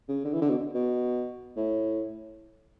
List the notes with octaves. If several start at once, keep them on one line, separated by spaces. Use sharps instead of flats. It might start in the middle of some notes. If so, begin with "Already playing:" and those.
C#3
D3
E3
D3
B2
B2
A2